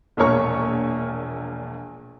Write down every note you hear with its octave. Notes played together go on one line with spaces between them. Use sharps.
E1 A#1 A#2 A#3 C#5 C#6